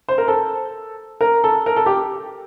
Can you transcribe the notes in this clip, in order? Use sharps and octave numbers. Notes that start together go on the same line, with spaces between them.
C5
A#4
A4
A#4
A4
A#4
A4
G4